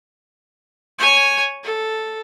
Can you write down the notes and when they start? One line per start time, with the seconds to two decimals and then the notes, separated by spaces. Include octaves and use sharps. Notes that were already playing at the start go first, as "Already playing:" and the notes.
0.99 C#5 G#5
1.64 A4